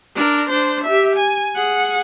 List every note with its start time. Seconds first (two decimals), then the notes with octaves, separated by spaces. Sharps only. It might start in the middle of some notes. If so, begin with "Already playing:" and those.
0.16 D4 A#4
0.49 D4 C5
0.84 G4 E5
1.16 G#5
1.55 G#4 F#5